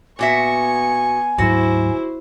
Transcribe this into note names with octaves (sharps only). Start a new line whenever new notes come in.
A#2 B3 F#4 E5 G#5 C#6
D2 G#2 F#3 E4 F#4 C5